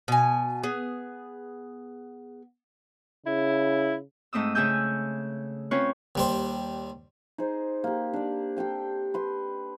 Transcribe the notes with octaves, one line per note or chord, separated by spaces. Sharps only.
B2 G#5
B3 G#4
C#3 E4
G#2 A3 C4 D#6 E6
C#3 A3 G#4 G#5 E6 G6
C4 C#4 F4 B4 C#5
D#2 G3 C5
D#4 G#4 C5
A#3 G4
D4 D5
G4 A4 G5 C6
B4 C6